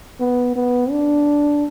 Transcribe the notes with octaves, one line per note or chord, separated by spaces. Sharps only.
B3
B3
D4